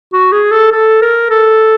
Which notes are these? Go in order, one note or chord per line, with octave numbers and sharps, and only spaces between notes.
F#4
G#4
A4
A4
A#4
A4